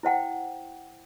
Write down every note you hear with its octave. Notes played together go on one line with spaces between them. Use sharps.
E4 C5 F#5 G5